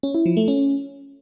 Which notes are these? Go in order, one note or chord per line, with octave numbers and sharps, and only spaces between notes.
C#4
E4
F3
A3
C#4